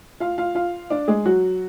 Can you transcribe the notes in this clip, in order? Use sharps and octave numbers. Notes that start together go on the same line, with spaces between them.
F4 F5
F4 F5
F4 F5
D4 D5
G#3 G#4
F#3 F#4